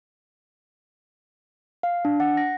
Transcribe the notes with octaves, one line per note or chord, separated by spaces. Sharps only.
F5
D4
F#5
A#6